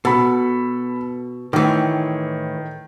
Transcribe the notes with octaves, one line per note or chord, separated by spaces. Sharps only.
B2 A4 B5
A2 D#3 E3